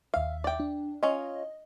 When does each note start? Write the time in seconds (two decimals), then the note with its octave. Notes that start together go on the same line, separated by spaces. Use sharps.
0.14 D#2 E5 F5
0.44 D5 G5
0.60 D4
1.03 C#4 F4 D#5